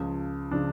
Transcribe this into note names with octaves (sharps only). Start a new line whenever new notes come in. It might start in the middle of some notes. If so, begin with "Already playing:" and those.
Already playing: C#2 C#3 F3
C#3 F3 D4